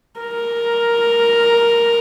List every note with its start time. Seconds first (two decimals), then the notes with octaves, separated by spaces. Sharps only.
0.20 A#4